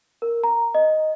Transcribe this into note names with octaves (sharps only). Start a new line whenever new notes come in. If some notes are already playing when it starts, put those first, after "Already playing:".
A#4
A#5
D#5